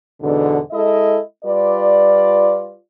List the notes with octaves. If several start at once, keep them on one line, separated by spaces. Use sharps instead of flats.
E2 G#2 B2 D3
G#3 E4 A4 D#5
G3 F4 B4 D5